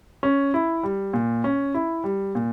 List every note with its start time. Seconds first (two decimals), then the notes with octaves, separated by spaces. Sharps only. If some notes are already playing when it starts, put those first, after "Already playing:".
0.23 C#4
0.54 E4
0.83 G3
1.13 A#2
1.44 C#4
1.74 E4
2.04 G3
2.35 A#2